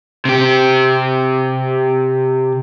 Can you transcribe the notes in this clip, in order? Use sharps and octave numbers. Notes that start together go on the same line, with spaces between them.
C3 G4